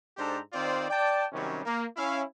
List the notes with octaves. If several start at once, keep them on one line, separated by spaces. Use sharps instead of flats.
G#2 D4 G4 A4 C5 A#5
D#3 C4 F4 C5 D5
D5 G5 A5
C3 D#3 F#3 G3 C#4
A#3
C#4 E4 F5